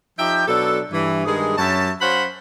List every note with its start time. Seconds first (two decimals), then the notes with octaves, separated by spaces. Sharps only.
0.19 F3 D#4 G4 E5 G5
0.47 B2 F#3 D4 A4
0.92 G2 E3
1.26 G2 D#3 G#3 G#4
1.58 F#2 C#5 E5 A5
2.00 F#3 C#4 C5 F5 F#5 B5